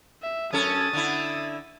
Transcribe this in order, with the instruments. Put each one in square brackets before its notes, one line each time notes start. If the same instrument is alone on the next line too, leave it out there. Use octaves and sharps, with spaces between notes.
[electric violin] E5
[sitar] F#2 C#4 A4 [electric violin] D#6 A6
[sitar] D3 E4